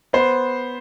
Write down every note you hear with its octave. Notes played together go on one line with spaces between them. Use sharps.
B3 C5